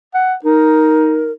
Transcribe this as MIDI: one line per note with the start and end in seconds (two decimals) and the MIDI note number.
0.14 0.34 78
0.44 1.32 63
0.44 1.31 70